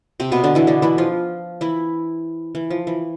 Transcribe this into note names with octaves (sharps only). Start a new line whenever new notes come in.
C3 C4
B2 B3
D3 D4
E3 E4
D3 D4
E3 E4
F3 F4
E3 E4
E3
F3
E3